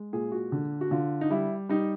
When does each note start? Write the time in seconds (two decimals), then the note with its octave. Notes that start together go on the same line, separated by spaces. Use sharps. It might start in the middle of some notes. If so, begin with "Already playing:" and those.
Already playing: G#3
0.13 A#2 G#4
0.32 F#4
0.52 D3
0.81 F#4
0.91 D3 F4
1.21 D#4
1.30 G3 E4
1.69 G3 D#4